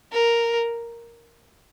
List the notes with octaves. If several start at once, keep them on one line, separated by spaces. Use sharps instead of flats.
A#4